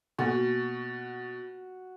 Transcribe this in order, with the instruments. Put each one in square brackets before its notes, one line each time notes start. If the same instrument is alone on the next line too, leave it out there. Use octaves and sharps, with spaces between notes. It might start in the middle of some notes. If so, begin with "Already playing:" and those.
[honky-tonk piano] B2 [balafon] A#3 [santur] F#4